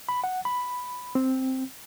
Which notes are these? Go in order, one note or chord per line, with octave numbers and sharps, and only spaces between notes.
B5
F#5
B5
C4